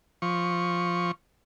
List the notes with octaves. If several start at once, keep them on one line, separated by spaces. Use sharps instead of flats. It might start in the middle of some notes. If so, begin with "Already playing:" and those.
F3 C#6